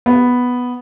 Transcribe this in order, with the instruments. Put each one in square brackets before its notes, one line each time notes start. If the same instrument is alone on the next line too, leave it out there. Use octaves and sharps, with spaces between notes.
[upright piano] B3